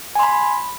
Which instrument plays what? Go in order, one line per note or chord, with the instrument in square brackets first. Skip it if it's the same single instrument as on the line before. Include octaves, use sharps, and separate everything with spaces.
[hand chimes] G#5
C6
B5